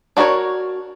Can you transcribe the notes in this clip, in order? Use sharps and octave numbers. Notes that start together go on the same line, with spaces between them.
D4 F#4 A#4 B4 C#5